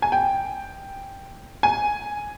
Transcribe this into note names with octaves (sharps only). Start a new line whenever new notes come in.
G#5
G5
G#5